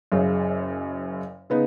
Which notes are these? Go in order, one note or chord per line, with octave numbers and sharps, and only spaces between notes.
F#1 F#2 C#3
C#3 B3 D#4